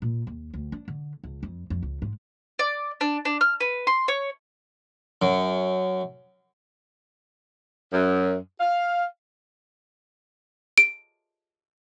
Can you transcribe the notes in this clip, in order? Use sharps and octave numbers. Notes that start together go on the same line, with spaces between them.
A#2
D#2
D2
D4
D3
C#2
F2
F2
C#2
G#2
D5
D4
D4
F6
B4
C6
C#5
F#2
F#2
F5
D7